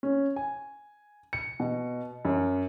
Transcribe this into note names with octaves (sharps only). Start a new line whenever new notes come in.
C#4
G#5
C#7
B2
F#2